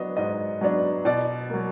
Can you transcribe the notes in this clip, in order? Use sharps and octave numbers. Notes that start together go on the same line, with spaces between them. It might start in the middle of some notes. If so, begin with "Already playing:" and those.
Already playing: F#3 B3 D4 D#5
G#2 D#5
F#3 B3 D4
B2 D5
F#3 A#3